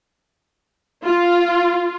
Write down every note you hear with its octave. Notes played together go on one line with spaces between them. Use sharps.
F4